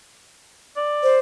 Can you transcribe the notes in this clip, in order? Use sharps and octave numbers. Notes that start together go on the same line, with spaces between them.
D5
C5